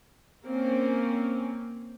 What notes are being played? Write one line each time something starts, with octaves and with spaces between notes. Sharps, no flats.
A#3 C4 C#4